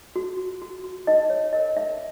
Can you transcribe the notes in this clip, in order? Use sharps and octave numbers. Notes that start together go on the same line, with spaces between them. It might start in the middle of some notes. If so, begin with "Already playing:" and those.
F#4
F#4
F#4
F#4
D#4 D#5
C#5
A#4 D#5
D#4 E5